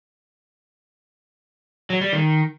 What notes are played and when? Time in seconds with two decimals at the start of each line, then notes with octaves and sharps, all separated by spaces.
1.90 F#3
2.01 G3
2.13 D#3